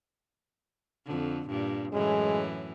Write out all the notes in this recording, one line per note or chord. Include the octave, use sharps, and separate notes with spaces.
F2 D3
G2 A#2
F#2 A2 E3 G#3